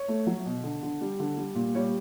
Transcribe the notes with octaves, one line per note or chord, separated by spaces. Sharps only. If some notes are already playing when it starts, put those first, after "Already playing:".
Already playing: C#5
A3
F#3
B2
D3
D3
G3
D3
G3
A#2
G3 C#5